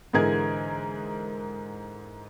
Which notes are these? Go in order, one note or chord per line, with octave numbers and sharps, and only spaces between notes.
G#2 D3 E3 G#4 A#4 G#6